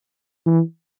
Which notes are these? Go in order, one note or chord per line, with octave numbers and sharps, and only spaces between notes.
E3